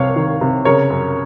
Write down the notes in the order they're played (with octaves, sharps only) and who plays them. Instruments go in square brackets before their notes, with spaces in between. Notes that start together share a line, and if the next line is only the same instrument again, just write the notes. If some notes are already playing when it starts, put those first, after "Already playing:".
Already playing: [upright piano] C2 C3 C#5 F5
D#3
C3
C#3 A#4 C#5
F#2